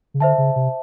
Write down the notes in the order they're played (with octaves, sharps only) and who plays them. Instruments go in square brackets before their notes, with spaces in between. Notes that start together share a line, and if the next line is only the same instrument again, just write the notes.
[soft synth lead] C#3
[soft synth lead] D3 [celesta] C5 E5 A5
[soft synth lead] C#3
C3